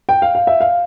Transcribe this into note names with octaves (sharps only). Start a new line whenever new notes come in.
G5
F5
F5
E5
F5